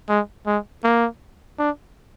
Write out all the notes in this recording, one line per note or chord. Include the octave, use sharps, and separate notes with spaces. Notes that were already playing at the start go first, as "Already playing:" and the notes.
G#3
G#3
A#3
D4